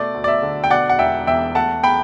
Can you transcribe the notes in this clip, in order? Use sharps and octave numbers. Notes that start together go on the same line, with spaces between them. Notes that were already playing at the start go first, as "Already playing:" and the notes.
Already playing: B2 A3 D5
D2
D5
E5
D3
G5
B2 D5 F#5
F#5
E1 E5 G5
E2 E5 G5
A3 F#5 A5
G5 B5